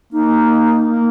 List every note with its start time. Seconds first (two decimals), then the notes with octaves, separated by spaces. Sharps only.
0.13 A#3 D#4
0.90 A#3